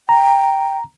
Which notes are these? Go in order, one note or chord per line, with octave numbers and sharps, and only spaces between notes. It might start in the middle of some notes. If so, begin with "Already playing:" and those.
G5 A#5